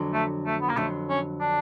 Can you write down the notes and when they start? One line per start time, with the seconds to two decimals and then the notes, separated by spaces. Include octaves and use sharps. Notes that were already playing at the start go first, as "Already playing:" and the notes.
Already playing: F2 D3 F#3
0.13 A3
0.46 A3
0.61 B3
0.69 A#3
0.76 F2 D3 F#3 A3
1.09 C#4
1.40 D4